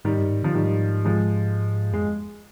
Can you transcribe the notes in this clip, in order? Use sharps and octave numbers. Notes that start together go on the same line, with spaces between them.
G#2 D#3 G3
G2
G#2
D3 F3
G#2 D#3 G3
F3 G#3
F2 G#3